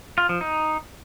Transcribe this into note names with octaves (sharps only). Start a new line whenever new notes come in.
F4
F3
D#4